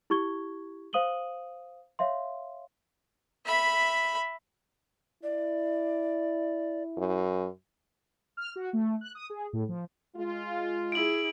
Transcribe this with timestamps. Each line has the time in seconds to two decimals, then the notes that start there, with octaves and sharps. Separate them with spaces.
0.10 E4 G4 C#6 G#6 G7
0.93 C5 F5 D#6 D#7 F#7 G7
1.99 C#5 E5 F5 C6
3.46 E5 B5
5.23 E4 D5
6.97 F#2
8.37 F6
8.56 F#4
8.73 A3
9.01 F#6
9.15 D#6
9.30 G#4
9.53 A2
9.69 F3
10.15 G#3 F4
10.92 E4 G#4 D7 F#7